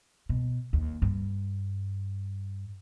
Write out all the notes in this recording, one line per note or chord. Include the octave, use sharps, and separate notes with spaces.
B2
D#2
G2